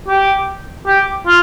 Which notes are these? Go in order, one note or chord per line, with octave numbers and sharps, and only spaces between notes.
G4
G4
F4